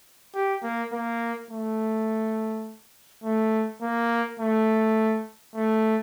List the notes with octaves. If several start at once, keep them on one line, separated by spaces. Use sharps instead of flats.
G4
A#3
A#3
A3
A3
A#3
A3
A3